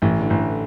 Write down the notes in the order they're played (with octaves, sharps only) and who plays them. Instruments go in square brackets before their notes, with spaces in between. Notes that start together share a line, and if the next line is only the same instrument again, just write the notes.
[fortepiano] A1 [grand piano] E3
[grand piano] D3
[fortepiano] A1